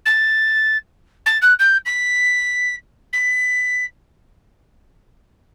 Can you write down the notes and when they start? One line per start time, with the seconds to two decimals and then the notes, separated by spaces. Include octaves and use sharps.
0.06 A6
1.26 A6
1.42 F#6
1.59 G6
1.86 B6
3.13 B6